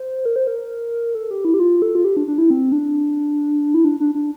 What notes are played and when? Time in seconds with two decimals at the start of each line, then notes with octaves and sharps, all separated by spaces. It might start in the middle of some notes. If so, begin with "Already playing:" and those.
Already playing: C5
0.25 A#4
0.36 C5
0.47 A#4
1.15 A4
1.31 G4
1.45 E4
1.54 G4
1.60 F4
1.82 A4
1.95 F4
2.05 G4
2.17 D4
2.28 D4
2.38 E4
2.50 C4
2.72 D4
3.74 E4
3.84 D4
4.00 D4
4.15 D4